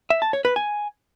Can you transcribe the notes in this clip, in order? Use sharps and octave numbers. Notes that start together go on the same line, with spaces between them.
E5
A5
C#5
B4
G#5